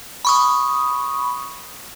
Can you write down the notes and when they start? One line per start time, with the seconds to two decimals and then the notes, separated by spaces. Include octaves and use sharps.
0.25 B5 C#6 D#6